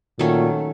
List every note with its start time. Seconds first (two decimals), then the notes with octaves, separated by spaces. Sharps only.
0.19 A#2 D#3 F#3 A3 C#4